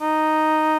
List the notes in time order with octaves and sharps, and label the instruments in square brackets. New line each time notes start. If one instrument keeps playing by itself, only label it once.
[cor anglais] D#4